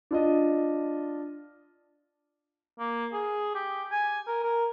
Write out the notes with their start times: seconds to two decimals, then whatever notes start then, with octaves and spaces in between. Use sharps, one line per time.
0.11 D4 F4 D#5
2.79 A#3
3.13 G#4
3.54 G4
3.91 G#5
4.27 A#4
4.43 A#4